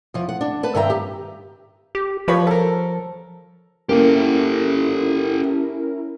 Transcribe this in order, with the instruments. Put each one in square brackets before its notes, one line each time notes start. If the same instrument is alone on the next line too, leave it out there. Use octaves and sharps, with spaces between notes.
[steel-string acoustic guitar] E2 F3
F#5
D4
B4 A5
G2 D#3 E5 G5 A#5
G4
[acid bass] G4
[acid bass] F3 [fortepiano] F4 B4 C#5
[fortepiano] A4 A#4
[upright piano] A#3 [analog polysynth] C#4 E4 A#4 [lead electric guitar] G4 A4